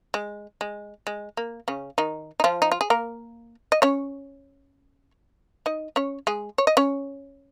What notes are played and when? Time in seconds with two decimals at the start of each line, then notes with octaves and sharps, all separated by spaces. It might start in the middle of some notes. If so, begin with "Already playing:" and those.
0.14 G#3
0.61 G#3
1.07 G#3
1.37 A#3
1.68 C#3 C#4
1.98 D#3 D#4
2.40 D#4
2.44 F3 F4
2.62 D#4
2.72 F4
2.81 G#4
2.90 A#3 A#4
3.72 D#5
3.82 C#4 C#5
5.66 D#4 D#5
5.96 C#4 C#5
6.27 G#3 G#4
6.58 C#5
6.67 D#5
6.77 C#4 C#5